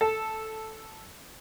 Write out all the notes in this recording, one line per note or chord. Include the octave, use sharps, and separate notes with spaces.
A4